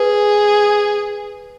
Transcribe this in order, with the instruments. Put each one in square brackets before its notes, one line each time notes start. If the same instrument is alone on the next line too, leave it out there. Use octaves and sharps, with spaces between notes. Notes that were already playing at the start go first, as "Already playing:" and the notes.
Already playing: [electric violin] G#4 [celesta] B4